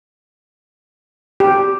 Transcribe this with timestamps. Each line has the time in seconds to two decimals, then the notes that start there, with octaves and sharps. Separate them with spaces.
1.40 G4